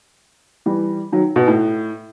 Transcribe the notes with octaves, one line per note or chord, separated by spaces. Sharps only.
E3 G3
D#3 F#3
B2
A2